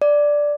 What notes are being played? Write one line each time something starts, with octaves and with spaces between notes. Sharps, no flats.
D5